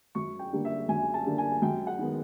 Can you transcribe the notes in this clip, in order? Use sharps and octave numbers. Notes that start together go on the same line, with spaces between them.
F#2 C#6
G5
D3 G3 A#3
E5
F#2 G#5
A5
D3 G3 A#3
G#5
F#2 G5
F#5
D#3 G#3 B3